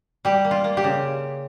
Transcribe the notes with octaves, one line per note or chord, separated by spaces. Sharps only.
G3 G4
A#3
F4
A#3
G4
C#3